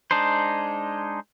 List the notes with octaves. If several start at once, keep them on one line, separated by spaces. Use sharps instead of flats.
G#3 D4 D#4 C5